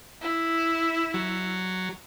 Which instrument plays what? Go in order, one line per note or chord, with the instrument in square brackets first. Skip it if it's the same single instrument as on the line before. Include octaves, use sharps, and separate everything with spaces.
[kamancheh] E4
[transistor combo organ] F#3